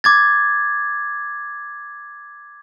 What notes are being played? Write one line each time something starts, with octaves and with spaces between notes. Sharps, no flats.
D6 G#6 A6